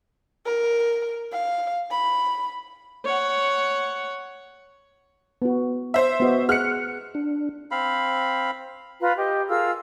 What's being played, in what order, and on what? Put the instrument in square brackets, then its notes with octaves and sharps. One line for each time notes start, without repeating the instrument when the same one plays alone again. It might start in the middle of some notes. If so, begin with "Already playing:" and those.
[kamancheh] A#4
F5
B5
[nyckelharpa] C#5 F#5
[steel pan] B3 F#4
[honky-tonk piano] C5 E5
[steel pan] B3 F#4 D#5
[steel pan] G#4 F#5 [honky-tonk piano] F6 F#6 C#7
[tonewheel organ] D4
[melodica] C4 F5 B5
[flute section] F4 B4 A#5 B5
G4 D#5
F4 G#4 A#4 E6